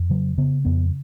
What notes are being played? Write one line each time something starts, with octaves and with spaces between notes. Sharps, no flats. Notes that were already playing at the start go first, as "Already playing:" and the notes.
Already playing: F2
C#3 F#3
C#3 B3
F2 B3